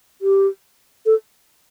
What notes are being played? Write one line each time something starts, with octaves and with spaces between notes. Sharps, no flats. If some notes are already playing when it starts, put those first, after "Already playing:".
G4
A4